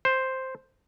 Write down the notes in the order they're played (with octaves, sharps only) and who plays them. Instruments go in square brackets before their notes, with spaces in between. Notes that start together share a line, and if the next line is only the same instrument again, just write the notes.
[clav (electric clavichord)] C5